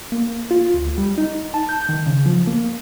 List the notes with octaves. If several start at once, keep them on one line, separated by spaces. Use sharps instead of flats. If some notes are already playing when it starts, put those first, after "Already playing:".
A#3
F4
D2
G3
D#4
A5
G6
D#3
C#3
F3
A#3